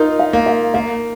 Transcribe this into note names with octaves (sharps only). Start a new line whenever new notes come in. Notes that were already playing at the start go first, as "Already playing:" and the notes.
Already playing: D#4 F4 A#4
F5
A#3
F5
A#3 F5